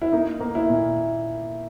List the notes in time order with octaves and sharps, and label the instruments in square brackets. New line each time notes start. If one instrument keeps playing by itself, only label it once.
[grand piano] E4
A#3 D#4
A#3
E4
A#2